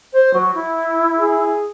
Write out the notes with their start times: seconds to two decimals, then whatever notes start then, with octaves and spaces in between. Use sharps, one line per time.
0.13 C5
0.34 F#3
0.55 E4
1.18 G#4